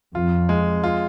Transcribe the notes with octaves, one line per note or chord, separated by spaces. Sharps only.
F2 F4
G#3
F4